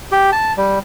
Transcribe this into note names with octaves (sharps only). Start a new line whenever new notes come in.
G4
A5
G3